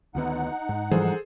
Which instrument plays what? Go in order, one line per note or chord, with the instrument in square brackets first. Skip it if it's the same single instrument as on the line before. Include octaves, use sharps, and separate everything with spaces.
[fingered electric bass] D2 D#3 B3 [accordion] D#4 F#5
[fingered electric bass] G#2
[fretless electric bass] E3 F3 G3 [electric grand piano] G#4 A4 C5